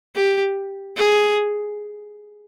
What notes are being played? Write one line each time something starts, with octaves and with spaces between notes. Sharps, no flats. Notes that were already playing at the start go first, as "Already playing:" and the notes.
G4
G#4